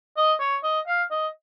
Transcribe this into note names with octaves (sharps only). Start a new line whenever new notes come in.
D#5
C#5
D#5
F5
D#5